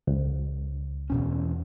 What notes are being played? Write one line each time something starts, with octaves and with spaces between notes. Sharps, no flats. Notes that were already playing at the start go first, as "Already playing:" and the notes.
C#2
E2 B2 C#4